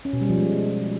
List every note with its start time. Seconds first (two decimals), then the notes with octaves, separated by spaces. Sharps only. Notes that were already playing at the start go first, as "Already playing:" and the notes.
0.05 C#4
0.13 B2
0.21 G3
0.29 F3
0.37 G#3